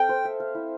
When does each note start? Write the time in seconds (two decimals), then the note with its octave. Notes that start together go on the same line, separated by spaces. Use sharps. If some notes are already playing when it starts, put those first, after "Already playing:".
Already playing: C4 A4 F5 G5
0.09 C5
0.25 E5
0.40 F5
0.55 E4